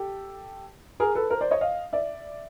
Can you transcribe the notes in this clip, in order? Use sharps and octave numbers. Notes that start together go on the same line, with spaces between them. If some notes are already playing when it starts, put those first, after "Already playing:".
Already playing: G4 A4
G#4 A#4
A4 B4
A#4 C5
C5 D5
C#5 D#5
D#5 F5
D5 E5